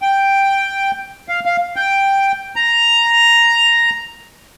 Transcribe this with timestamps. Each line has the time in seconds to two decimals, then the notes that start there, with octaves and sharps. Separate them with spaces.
0.02 G5
1.29 F5
1.45 F5
1.76 G5
2.56 A#5